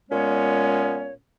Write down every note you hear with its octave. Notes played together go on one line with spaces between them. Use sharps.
A#2 G#3 B3 C#4 C#5